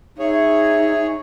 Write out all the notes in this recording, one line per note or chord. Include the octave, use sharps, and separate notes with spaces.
D#4 G#4 C#5 E5